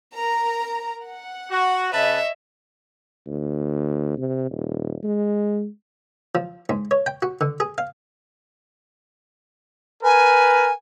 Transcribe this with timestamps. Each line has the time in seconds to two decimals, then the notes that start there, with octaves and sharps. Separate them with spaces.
0.15 A#4 A#5
1.04 F#5
1.51 F#4
1.93 C#3 B4 C#5 D#5 E5 A5
3.26 D2
4.17 C3
4.51 D#1
5.03 G#3
6.35 F3
6.69 G#2
6.91 C#5
7.06 G5
7.22 F#4
7.41 D3
7.60 G#4
7.78 F5
10.03 A#4 B4 G#5